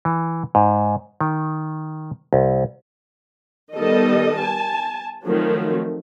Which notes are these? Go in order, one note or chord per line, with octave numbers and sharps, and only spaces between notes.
E3
G#2
D#3
C2
D#3 G3 B3 A4 D#5
G#5 A5
D#3 F3 F#3 A3 C4